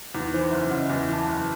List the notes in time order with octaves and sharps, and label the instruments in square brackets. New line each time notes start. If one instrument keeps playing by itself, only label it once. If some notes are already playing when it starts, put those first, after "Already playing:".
[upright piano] E2 [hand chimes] D#4
[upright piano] E3 [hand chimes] C5
[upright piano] F#1 [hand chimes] E5
[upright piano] C#3 [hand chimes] F#5
[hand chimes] D#5
[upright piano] E2 [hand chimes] E5
[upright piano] E3 [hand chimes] A5
[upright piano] F#1